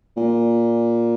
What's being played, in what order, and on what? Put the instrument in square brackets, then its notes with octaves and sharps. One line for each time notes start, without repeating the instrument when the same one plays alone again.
[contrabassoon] A#2